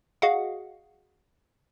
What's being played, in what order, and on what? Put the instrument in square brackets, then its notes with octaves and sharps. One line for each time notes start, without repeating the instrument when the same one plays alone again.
[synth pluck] F#4 G#4 D#5 F5 F#5